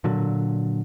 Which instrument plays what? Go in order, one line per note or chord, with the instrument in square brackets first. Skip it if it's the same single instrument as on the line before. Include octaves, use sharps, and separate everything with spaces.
[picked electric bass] A#2 D3 F#3